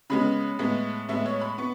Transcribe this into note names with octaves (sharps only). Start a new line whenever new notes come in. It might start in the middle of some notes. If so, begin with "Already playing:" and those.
C#3 G#3 B3 B5
A2 G#3 B3
A2 G#3 B3 E5
C#5
B5
B3 C#6